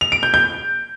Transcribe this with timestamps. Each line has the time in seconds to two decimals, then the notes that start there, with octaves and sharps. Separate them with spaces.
0.01 F7
0.12 D7
0.23 G6
0.34 G6